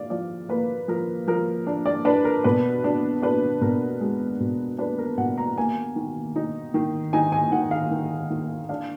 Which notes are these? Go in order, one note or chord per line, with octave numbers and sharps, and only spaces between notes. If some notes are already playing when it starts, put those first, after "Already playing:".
Already playing: D5 F5
F3 D5
A#3 B4
F3 A#4
F3 A#4
D4
D5
D4 B4
A#4
B2 B4
D4
D4 B4
B2 A#4
G#3
B2
D4 B4
A#4
B2 F#5
A#5
A#3 G#5
D#3
D#4
D#3
D#4 G#5
G#5
D#3 F#5
F5
D#3
D#3
D4 F5